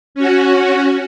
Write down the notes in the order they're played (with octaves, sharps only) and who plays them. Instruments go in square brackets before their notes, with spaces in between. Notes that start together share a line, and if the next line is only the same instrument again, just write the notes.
[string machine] C#4 F#4